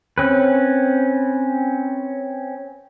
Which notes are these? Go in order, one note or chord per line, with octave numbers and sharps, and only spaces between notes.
C4 C#4 B4